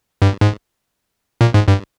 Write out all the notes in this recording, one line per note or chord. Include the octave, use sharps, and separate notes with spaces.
G2
G#2
A#2
G#2
G2